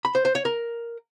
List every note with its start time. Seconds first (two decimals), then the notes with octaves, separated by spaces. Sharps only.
0.05 B5
0.15 C5
0.25 C5
0.35 C#5
0.45 A#4